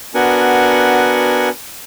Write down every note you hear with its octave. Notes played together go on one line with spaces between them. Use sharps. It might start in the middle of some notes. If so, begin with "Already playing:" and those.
B3 D4 F#4 A#4 F#5 G#5